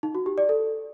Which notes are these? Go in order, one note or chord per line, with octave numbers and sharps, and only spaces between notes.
D#4
F#4
G4
D5
A4